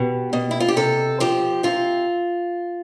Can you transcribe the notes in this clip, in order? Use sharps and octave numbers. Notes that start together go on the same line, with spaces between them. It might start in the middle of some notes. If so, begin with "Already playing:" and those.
Already playing: B2 G4
B2
E4
F4
G4
C3 A4
F3 G4
C3 F4